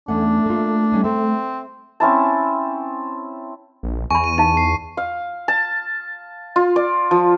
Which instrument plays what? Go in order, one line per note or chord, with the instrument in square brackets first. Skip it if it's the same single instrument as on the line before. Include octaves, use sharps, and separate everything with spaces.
[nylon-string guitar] E2 C#4 F#5 [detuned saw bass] A3 [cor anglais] D4
[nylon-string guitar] A#3 F4
G3 C#4 D#4
[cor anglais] C4 [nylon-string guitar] A4 E5
[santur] C4 C#4 E4 A5
[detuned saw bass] A#1
[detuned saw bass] E2 [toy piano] G#5 B5 [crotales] C#6
[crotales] D#7
[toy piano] D#4 F5 A5 [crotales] D#7
[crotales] C7
[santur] F5
A5
F4
D5
F3